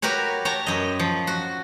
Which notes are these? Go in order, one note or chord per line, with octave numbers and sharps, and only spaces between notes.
F#4 G4 A#4 B4 C#5
C#5 G5 A5 A#5
F#2 D#5
F3
F#4